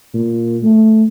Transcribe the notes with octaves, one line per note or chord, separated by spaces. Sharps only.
A#2
A3